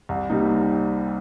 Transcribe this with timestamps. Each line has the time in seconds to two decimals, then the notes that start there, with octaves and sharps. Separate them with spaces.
0.09 C2
0.30 C3 G3 A#3 D#4